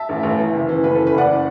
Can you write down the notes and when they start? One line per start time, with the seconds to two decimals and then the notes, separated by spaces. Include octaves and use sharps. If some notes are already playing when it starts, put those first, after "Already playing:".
Already playing: E5 A5
0.09 A1
0.23 A1
0.38 E3
0.54 F#1
0.69 E3
0.84 F#1 B4
0.95 E3 A4
1.07 B4
1.14 F#1 D5 F#5